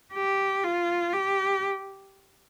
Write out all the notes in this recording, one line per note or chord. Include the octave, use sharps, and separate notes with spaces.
G4
F4
G4